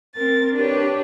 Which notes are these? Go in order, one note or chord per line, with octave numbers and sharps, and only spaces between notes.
C4 A#4 A6
D4 G4 B4 C#5